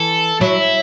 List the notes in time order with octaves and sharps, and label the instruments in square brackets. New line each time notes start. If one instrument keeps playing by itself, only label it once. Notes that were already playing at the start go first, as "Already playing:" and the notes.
Already playing: [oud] E3 [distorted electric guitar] A4
[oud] F#3 [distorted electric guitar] E4